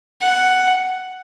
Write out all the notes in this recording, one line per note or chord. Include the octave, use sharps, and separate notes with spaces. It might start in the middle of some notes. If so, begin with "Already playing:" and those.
F#5